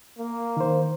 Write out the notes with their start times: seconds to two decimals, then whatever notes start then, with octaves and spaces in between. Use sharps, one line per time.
0.18 A#3
0.57 D#3 C5